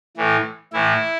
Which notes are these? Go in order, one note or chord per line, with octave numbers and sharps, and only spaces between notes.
A2 E3
A2 E3 E4